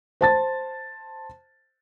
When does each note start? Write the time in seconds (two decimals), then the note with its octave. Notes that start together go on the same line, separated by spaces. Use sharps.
0.21 C5 A5 A6